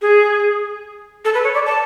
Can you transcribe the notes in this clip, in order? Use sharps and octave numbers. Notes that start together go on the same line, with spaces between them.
G#4
A4
B4
C#5
D5
A5